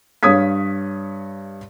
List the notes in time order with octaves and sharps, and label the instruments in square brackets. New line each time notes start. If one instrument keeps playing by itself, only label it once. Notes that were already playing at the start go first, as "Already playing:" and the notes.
[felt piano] G2 C#5 F5 D#6 G#6 B6